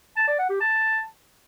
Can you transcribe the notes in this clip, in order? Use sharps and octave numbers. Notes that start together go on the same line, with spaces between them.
A5
D5
F#5
G4
A5